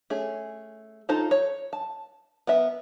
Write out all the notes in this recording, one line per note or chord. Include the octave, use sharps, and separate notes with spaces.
A3 C#4 G#4
D#4 F4 A4 C5 A#5
C#5
A5
B3 A#4 E5